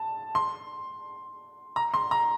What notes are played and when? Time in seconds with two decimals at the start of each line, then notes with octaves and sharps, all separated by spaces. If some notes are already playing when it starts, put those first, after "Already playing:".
Already playing: A5
0.35 C6
1.76 A#5
1.94 C6
2.11 A#5